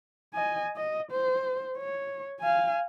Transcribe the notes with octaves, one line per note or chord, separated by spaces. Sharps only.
D#5 G#5
D#5
C5
C#5
F5 G#5